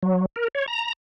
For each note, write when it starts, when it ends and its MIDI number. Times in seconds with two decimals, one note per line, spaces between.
0.03 0.26 54
0.36 0.48 70
0.55 0.66 73
0.68 0.93 82